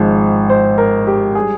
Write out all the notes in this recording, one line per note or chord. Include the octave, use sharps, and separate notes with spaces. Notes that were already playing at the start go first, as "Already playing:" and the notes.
Already playing: G#1 G#2 F3
C5
A#4
G4
G3 G#4